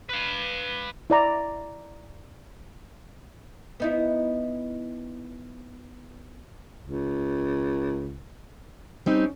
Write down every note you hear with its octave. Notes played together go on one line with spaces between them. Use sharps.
B4 F5
E4 D5 A#5
B3 D#4 E4
C#2
G3 C4 C#4 D#4